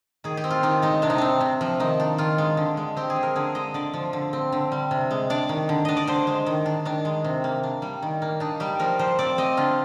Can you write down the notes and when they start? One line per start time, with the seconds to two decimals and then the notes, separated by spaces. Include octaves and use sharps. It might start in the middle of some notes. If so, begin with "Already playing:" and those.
0.24 D#3 G#4
0.37 G4
0.44 C4
0.51 F4
0.63 D#3 D#4
0.82 G#3 D#4
1.02 C3 D4
1.10 D#4
1.18 C4 D4
1.41 C3
1.61 F3
1.80 D#3 D#4
2.00 D4
2.18 D#3 F4
2.38 G#3
2.57 D3
2.77 G#3
2.97 C4 G4
3.10 G#4
3.16 F3
3.23 A#4
3.36 D3 G#4
3.55 G#3 D#5
3.74 D3 D5
3.94 F3
4.13 D3
4.33 C4
4.52 D3
4.72 G3
4.91 C3
5.11 G#3
5.30 D4 D5
5.49 D#3
5.69 D3
5.85 D4 D#5
5.97 D5
6.08 D3 C5
6.27 G#3
6.46 D#3
6.66 D4
6.85 D#3 D4
7.05 G#3
7.24 C3
7.44 A#3
7.63 D4
7.82 G3
8.02 D#3
8.22 A#3
8.40 D4 D#4
8.60 G3 G4
8.79 F3 A#4
8.99 F3 C5
9.19 C4 D5
9.38 C4 D#5
9.57 D3 F4